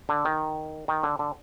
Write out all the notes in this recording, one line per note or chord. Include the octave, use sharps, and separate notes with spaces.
D3
D#3
D#3
D3
D3